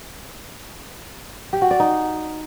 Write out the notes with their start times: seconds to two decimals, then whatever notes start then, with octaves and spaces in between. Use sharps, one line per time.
1.53 G4
1.62 F#4
1.71 D5
1.80 D#4